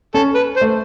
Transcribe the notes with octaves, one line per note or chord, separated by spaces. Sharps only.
C#4 A4
B4
C5
A3